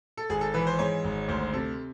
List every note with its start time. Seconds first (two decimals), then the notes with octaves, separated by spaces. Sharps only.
0.17 A4
0.29 G#1 G#4
0.41 A4
0.54 E3 B4
0.67 C5
0.79 G#2 C#5
1.04 G#1
1.28 D2 C5
1.53 C3 A4